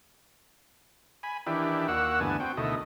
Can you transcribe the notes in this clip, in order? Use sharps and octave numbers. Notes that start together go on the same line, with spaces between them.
G#5 B5
D#3 E3 D4 E4 G4
D#2 A#3 F#4 F#5 E6
D2 G2 E3 B3 G#5 A5
C4 F#4 G5
D2 B2 D#3 E4 A4 D#5